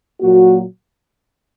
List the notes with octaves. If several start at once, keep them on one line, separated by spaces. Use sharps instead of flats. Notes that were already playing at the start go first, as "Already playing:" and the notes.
A#2 F#3 A#3 F#4